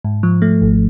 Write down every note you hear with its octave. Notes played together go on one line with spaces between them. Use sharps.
G#2
F3
A3
G#1